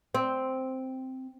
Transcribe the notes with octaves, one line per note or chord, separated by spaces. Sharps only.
C4